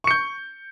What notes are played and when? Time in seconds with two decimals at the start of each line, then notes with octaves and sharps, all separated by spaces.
0.04 C#6
0.07 C#7
0.11 G6